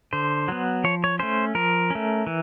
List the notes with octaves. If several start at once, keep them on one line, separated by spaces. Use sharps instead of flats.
D3 C5
F#3 B3
F3 C#5
C#5
A3 C#4 C5
F3 A#4
A3 C#4
E3